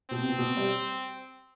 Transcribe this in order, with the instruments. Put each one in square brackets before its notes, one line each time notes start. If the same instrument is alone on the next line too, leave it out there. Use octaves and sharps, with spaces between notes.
[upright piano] B2 [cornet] C4
[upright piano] C3
B2
B2
G3